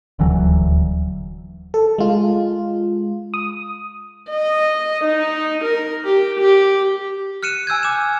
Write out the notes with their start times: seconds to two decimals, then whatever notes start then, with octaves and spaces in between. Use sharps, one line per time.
0.19 D#1 D2 E3 F#3
1.74 A4
1.98 G#3 F4
3.34 D#6
4.30 D#5
5.04 D#4
5.64 A#4
6.05 G4
6.40 G4
7.43 F6 F#6 C#7 D#7 E7
7.67 G#5 E6 G6 G#6
7.83 D6 E7